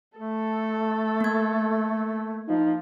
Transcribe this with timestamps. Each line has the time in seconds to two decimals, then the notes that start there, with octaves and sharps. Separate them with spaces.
0.17 A3 A4
1.21 A#3 G#6
2.49 F3 D#4